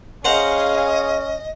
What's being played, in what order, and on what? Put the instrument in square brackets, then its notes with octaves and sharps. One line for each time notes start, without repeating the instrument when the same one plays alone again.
[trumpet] C#4 [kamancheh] G#4 F5 [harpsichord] C5 F#5 A#5 [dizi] D#5